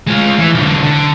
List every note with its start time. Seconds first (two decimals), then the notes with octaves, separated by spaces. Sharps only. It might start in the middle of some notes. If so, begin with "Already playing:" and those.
0.08 G#3 F4
0.38 E3
0.54 B1 D3
0.83 D3